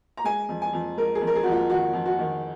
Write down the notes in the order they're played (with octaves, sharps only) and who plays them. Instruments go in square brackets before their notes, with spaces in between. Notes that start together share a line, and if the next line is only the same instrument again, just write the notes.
[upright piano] A#5
G#3 G#5
F2
G#5
F2
G#3 A#4
G#4
F2
A#4
G#4
F2 F#4
F4
D#3 F#4
F2
F#4
D#3